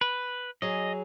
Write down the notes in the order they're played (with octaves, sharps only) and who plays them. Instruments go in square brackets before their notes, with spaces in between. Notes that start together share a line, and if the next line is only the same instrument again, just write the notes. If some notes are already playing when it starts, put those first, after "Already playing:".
[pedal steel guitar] B4
[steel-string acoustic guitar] F#3 G#4 [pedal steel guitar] D#5